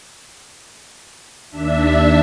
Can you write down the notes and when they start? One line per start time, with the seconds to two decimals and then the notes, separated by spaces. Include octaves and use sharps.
1.50 D#2 D4 E5